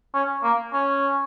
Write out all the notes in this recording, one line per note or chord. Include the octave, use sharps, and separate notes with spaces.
C#4
A#3
C#4